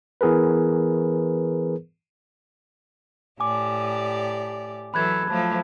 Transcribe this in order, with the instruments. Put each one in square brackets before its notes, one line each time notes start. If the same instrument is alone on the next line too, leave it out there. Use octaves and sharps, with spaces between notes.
[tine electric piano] E3 B3 G#4 A#4 B4
[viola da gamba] A2 G4 D5 [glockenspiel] G#5 D6
[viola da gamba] E3 F#3 A4 [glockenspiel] B5 F#6 G#6
[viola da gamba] F3 F#3 A3 [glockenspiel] A5